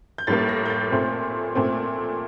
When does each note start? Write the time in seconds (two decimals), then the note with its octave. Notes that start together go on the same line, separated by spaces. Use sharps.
0.18 G6
0.27 A2 G3 A#3 A6
0.49 A#6
0.66 G6
0.70 A6
0.91 A#2 A3 C4
1.55 A#2 A3 C4